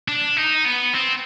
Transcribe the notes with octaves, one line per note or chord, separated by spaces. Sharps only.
D4
D#4
B3
C4